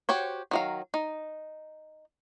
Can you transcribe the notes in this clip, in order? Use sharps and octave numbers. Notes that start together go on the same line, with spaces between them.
F#4 G4 C5 C#5
D#3 F#3 F5
D#4